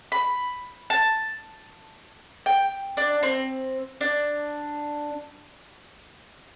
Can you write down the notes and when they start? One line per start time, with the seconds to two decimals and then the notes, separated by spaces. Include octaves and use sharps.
0.12 B5
0.90 A5
2.46 G5
2.97 D4
3.23 C4
4.01 D4